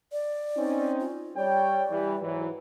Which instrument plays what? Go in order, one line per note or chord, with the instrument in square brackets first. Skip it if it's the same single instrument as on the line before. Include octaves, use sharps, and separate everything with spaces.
[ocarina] D5
[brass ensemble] C4 C#4 D#4
[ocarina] F4
[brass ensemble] G3 C#5 G5 [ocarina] D5
[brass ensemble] E3 G3
G#2 E3 F#3